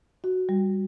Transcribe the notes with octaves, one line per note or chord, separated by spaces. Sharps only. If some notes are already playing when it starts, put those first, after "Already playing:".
F#4
G3